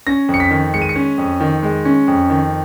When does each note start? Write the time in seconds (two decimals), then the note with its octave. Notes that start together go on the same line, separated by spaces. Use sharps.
0.07 C#4 A#6
0.29 F2
0.34 C#7
0.40 B6
0.51 D#3
0.73 G#3 C#7
0.82 D#7
0.89 C#7
0.96 C#4
1.18 F2
1.40 D#3
1.63 G#3
1.85 C#4
2.08 F2
2.30 D#3